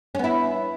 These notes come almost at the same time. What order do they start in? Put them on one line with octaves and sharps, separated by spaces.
C#4 B3 E4